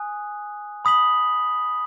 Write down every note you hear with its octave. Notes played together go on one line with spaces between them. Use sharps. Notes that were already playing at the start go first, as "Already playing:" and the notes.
Already playing: G#5 D#6 F#6
B5 D#6 B6 F#7